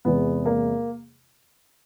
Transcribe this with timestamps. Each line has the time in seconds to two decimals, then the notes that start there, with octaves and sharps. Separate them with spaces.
0.05 E2 C3 E3 G#3 B3
0.46 A#3